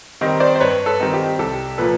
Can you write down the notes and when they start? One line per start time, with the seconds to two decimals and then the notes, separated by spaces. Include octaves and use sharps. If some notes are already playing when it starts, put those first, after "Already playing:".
0.21 D#3 G3 C4 D#4
0.40 C5 D5
0.55 C5
0.60 G2 B4 C#5
0.86 A4 B4
0.99 D#3 G3 C4 D#4
1.14 G4
1.39 C2 G4 A4
1.78 A#2 F3 A#3 A4 B4